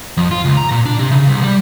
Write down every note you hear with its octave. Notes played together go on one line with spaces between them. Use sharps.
F2
F4
C#2
A#5
A#2
D4
C3
C#3
C2
G3